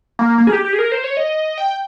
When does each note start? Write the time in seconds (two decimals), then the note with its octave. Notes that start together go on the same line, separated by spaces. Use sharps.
0.19 A#3
0.38 A#3
0.47 G#4
0.52 G4
0.65 G4
0.73 G#4
0.79 A#4
0.92 C5
1.04 C#5
1.17 D#5
1.58 G5